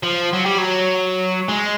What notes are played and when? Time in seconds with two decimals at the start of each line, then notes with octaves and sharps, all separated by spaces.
0.03 F3
0.33 F#3
0.46 G3
0.58 F#3
1.48 G#3